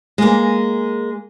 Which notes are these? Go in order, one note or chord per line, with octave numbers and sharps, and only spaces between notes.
G#3 A#3